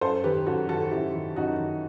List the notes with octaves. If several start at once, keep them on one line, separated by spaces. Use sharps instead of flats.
F#2 A4 C5
D#3 G4 B4
F#2 F#4 A4
D#3 F#4 A4
F#2 E4 G4
D#3
F#2 D#4 F#4
D#3